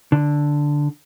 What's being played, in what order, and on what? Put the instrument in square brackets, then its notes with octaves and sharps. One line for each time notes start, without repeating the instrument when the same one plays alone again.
[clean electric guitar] D3